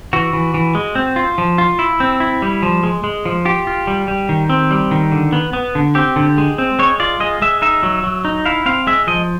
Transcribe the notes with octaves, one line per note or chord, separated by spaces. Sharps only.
E3 F#4
E3
E3
G#3
C4
F4
F3
F4
E4
C4
E4
G3
F3
G#3
G#3
F3
F4 G4
F4
G3
G3
D#3
C4
G3
D#3
D3
B3
B3
D3
C4 G4
D3
G#3
C4
G#3 C#5
F4 D5
G#3 D#5
G#3 E5
D#4 E5
F#3
F#3
D#4
E4 F5
C4 F5
G#3 E5
F3 D#5